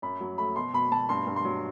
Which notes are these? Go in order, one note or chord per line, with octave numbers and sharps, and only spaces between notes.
F#2 B5
F#3
A3 B5
B2 C6
B2 B5
B2 A5
G2 C6
G2
C6
F#3